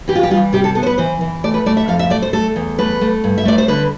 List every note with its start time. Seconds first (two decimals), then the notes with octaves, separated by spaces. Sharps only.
0.08 E3 G4
0.15 F4
0.23 G4
0.30 G3 F4
0.53 C3 G4
0.64 A4
0.75 B3 A4
0.83 C5
0.86 B4
0.98 E3 C5
1.21 E3
1.44 A3 D5
1.54 B4
1.66 A3 D5
1.77 E5
1.88 F2 F5
1.99 E5
2.10 A3 D5
2.22 C5
2.33 A3 A4
2.56 E2
2.79 A3 B4
3.01 A3
3.24 G2
3.38 E5
3.45 A3 D5
3.58 C5
3.68 D3 B4